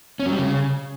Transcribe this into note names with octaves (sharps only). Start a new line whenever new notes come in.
C#4
F#3
G3
C#3